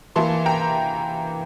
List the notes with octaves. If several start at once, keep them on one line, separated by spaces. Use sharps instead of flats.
E3 A#3 E4 A5 C6
G5 A#5